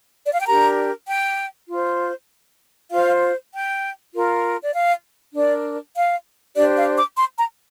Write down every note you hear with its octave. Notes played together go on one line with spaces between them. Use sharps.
D5
F5
G5
D4 G4 A#4 A#5
G5
F4 C5
F4 C5 F5
G5
F4 A#4
D5
F5
D4 A#4 D5
F5
D4 G4 C5 D5
F5
D6
C6
A#5